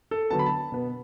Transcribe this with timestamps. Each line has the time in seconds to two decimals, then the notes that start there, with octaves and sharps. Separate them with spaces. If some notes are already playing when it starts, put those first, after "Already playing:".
0.11 A4
0.30 D3 F#3 B3 A5
0.39 B5
0.46 A5
0.72 B2 B3